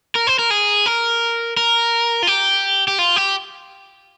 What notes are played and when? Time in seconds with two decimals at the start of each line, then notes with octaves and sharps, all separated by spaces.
0.15 A#4
0.27 C5
0.39 A#4
0.50 G#4
0.86 A#4
1.57 A#4
2.23 F4
2.27 G4
2.88 G4
2.99 F4
3.16 G4